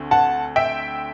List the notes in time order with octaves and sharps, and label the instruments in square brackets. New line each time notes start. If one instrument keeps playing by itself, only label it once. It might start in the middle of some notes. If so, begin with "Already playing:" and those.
Already playing: [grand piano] D2 D3 A3 C4
[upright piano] F#5 A5
E5 G5